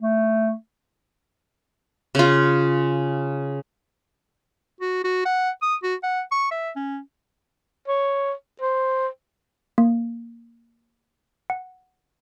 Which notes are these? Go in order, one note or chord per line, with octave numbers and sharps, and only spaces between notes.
A3
C#3 F4
F#4
F#4
F#5
D#6
F#4
F#5
C#6
E5
C#4
C#5
C5
A#3
F#5